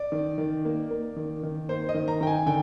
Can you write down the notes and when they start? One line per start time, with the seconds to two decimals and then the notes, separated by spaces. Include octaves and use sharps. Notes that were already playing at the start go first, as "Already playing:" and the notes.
Already playing: D5
0.12 D#3
0.38 D#3
0.65 A#3
0.91 A#3
1.16 D#3
1.43 D#3
1.69 A#3 C5
1.89 D#5
1.94 D#3
2.08 A#5
2.21 D#3 G5
2.27 G#5
2.46 D3 G5